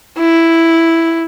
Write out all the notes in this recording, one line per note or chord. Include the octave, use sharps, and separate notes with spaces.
E4